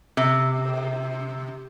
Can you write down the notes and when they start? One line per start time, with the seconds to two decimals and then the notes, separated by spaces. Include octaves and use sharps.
0.17 C3